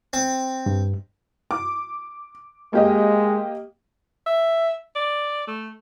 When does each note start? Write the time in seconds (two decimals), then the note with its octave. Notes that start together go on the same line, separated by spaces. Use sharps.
0.13 C4
0.66 G2
1.51 D6
2.73 G#3 A#3 G4 D#5
4.26 E5
4.95 D5
5.47 A3